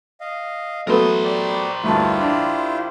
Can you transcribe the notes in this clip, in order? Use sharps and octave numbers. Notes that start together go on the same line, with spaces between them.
D#5 F5
F#3 A3 B3 A#4 C5 D#6
G4 D5
D2 G2 E4 F4 G4 A5
D4